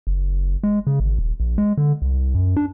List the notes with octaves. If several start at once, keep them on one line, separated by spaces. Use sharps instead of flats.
F#1
G#3
C#3
G#1
D#1
A#1
G#3
D3
C2
F#2
D4